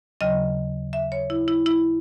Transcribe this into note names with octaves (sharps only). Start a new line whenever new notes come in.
D#2 C#3 F#3 D#5
E5
C#5
E4
E4
E4